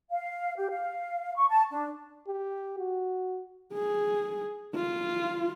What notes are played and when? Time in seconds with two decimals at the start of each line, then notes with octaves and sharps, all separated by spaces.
0.11 F5
0.56 G4
0.71 F5
1.36 C#6
1.49 A5
1.71 D4
2.28 G4
2.78 F#4
3.74 G#4
4.75 F4